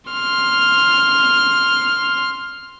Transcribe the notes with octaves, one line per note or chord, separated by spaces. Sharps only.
C6 F6